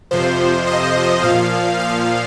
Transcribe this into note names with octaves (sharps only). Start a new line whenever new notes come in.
F2 C3 F3 C5
D#5
A#2 F3 F5
F5